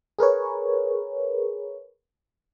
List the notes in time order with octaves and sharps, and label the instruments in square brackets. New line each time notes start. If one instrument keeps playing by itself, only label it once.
[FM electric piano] G#4 A#4 B4 C#5